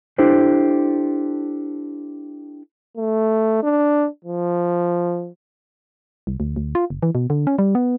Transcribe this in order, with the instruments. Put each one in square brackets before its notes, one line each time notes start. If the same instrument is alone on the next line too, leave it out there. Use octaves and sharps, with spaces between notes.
[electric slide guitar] D4 E4 G4 A4 C5
[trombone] A3
D4
F3
[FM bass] C2
D2
D2
F4
F#1
E3
B2
D3
C#4
G3
B3